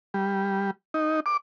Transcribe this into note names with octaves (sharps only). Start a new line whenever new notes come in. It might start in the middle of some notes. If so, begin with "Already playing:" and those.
G3
D#4
D6